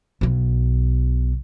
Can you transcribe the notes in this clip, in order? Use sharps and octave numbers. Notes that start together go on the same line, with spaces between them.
B1 B2